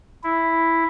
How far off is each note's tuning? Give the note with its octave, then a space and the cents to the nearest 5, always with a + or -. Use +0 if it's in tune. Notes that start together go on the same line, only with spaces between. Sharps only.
E4 +0